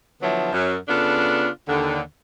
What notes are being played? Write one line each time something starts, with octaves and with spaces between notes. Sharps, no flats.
D3 F3 F#3 B3 E4
F#2
C#3 B3 D4 F4 A4
D#2 D3